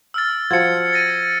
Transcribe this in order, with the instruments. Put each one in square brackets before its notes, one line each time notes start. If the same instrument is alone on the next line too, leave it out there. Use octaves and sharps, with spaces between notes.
[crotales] E6 F6 A6
[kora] F3 F4 F#4 [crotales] G#6 C#7
[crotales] A6 A#6 D#7